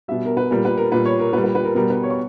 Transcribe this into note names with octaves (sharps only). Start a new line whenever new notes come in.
B2 G3 E5
A#4
B4
A#2 G3 A#4
B4
A#4
A#2 G3 B4
C#5
A#4
A#2 G3 B4
B4
B4
A#4
B2 G3 A#4
B4
C#5
C#6